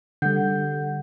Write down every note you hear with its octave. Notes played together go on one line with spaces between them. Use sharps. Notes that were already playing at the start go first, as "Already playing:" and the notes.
D3 G3 A4 F#5 G6